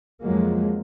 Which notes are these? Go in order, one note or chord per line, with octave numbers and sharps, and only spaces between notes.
F2 F3 F#3 G#3 A#3